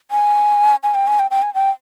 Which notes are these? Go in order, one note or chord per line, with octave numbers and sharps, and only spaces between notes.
G#5
G#5
G5
G#5
G5
G5
G#5
G5